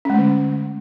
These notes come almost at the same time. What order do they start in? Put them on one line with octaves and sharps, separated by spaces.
C#4 G#3 A3 D3